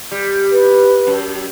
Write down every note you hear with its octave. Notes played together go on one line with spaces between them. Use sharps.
G3
B4
F#2